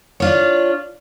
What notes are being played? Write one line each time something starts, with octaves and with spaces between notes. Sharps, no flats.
D4 F4 C#5